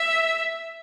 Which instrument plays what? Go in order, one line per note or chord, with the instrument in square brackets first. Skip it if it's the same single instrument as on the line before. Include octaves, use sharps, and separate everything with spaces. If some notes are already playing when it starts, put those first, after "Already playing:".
Already playing: [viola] E5